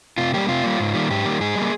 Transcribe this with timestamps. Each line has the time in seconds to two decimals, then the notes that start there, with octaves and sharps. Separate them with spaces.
0.18 C3 F4
0.34 G3 A#3 G4
0.48 C3 F4
0.64 G3 A#3
0.80 G#2
0.94 D#3 G3 A#3
1.10 G#2 G4
1.25 D#3 G3 A#3
1.41 G#2 G#4
1.55 G3 A#3